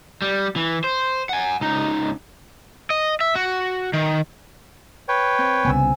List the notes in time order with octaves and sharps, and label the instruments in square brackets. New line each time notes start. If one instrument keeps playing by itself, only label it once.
[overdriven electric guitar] G3
E3
C5
F#5 G#5
C#2 D#4
D#5
E5
F#4
D#3
[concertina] B4 C#5 G5
[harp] C4
[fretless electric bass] C2 C#3 B3 [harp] G#5 E6